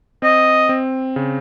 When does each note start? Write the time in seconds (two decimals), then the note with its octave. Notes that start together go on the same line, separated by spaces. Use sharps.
0.22 C4 D#5
0.69 C4
1.16 C#3